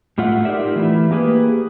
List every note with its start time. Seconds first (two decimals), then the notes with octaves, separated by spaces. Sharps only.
0.18 A2 A3 F4 E5 F#5
0.45 D#4 F4 G4 A#4 D5 E5
0.76 E3 A3 E4
1.11 A#3 G4 G#4 B4